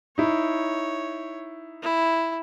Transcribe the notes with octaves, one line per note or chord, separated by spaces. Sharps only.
D#4 E4 C#5
E4